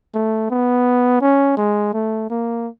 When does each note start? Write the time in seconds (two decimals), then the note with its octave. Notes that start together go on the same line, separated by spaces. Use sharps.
0.14 A3
0.50 B3
1.21 C#4
1.57 G#3
1.94 A3
2.30 A#3